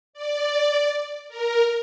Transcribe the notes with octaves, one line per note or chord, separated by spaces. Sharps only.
D5
A#4